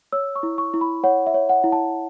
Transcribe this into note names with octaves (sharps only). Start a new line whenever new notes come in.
C#5 E6
C#6
E4
C#6
E4
B5
C#5 F#5
E5
C#5
F#5
E4
A5